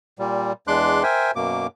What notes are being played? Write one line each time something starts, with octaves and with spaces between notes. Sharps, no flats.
A#2 G3
E2 G#3 D4 C6 D6 F#6
A#4 C5 E5 G5 G#5
F#2 B2 A#3 D6